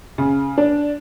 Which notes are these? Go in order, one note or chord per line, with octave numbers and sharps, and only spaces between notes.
C#3
D4